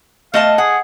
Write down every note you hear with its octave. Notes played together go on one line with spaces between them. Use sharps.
A3 D#5 F5 A5
G#4 F#5